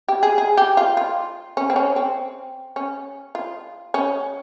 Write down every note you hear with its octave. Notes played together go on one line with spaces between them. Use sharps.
G4
G#4
G#4
G4
F4
F4
C#4
C4
C#4
C4
C#4
F4
C#4